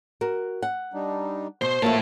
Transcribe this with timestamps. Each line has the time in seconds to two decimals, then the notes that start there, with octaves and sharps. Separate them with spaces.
0.21 F#4 A#4
0.63 F#5
0.93 G3 D4 D#4
1.62 B2 C5
1.82 A2 F3 A3 A#3 F#4 C#5 E5 A5